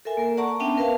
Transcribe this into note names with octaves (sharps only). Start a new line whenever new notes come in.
A4 A#4 E5 G#5
A#3 A#4
D5 F#5 A5 A#5 C#6
B3 C#4 D4 E5 G5 A5
A#4 B4 E5 F5 A5